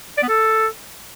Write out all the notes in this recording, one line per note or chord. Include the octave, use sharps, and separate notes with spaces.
D5
B3
A4